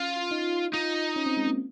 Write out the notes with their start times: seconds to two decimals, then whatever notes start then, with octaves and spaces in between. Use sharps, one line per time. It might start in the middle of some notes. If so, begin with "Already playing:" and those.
Already playing: C#4 F4
0.31 D#4
0.73 D#4 F4
1.16 C#4
1.26 C4
1.37 G#3
1.47 A#3